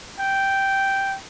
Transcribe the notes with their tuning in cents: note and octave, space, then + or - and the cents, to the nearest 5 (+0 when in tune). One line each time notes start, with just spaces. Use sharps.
G5 -5